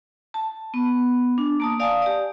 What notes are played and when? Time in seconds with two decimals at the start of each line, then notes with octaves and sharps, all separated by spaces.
0.34 A5
0.74 B3
1.38 D4
1.60 A#3 A5 D#6
1.80 D5 F5 G#5 A5 D#6
2.02 G4 D5